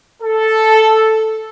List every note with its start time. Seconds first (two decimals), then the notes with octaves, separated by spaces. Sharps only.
0.23 A4